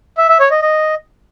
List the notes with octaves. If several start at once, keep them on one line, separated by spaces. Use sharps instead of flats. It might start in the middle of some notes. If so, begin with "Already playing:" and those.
E5
E5
C#5
D#5
D#5